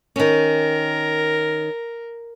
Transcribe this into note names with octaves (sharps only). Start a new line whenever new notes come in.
D#3 C#4 A#4